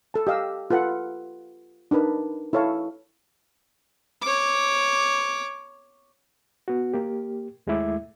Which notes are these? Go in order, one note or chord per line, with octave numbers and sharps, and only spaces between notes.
A4 A5
G4 D#5 F5 E6
F4 A4 B4 F#5
D4 D#4 A#4 B4
E4 A4 C#5 F5 A5
C#5 D6
B3 F#4
A#3 G4
D#2 G#3 A3 E4 E5 D6